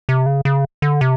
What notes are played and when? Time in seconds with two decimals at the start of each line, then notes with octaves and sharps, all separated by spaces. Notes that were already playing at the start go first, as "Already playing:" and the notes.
0.09 C3
0.26 C#3
0.45 C#3
0.82 D3
1.01 C3